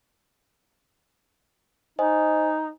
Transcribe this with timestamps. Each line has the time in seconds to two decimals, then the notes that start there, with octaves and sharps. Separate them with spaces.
1.99 D#4 C5 D#5 G#5